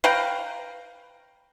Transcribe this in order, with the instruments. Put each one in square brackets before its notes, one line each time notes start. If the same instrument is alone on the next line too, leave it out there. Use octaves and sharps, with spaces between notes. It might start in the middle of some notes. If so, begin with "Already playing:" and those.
[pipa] B4 F5 G5 A#5